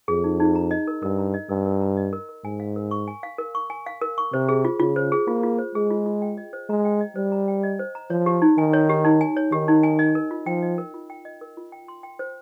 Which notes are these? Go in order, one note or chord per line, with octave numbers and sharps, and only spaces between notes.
F2 G#4
D#4
D#4
A#5
D#5
A#4
G2 A#4
A#5
D#5
G2 A#4
A#4
A#5
D#5
A#4
A#4
G#2 G#5
F5
A#4
C#6
G#5
F5
A#4
C#6
G#5
F5
A#4
C#6
C3 C5
G#4
F4
C#3 F4
C5
G#4
A#3 F4
F4
C5
G#3 G#4
F4
F4
G5
D#5
C5
G#3 A#5
G5
D#5
G3 C5
A#5
G5
D#5
C5
A#5
F3 C#5
G4
D#4
D#3 G#5
C#5
G4
D#4
G#5
C#5
D#3 G4
D#4
G#5
D#5
A#4
F4
F3 G5
D#5
A#4
F4
G5
D#5
A#4
F4
G5
C6
G5
C5